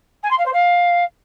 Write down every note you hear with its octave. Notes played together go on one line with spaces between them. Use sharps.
G#5
C6
F5
C5
F5